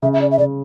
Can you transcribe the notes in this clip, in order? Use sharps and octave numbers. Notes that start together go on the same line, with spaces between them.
C#3 E5
E5
D5
E5
C#3 D5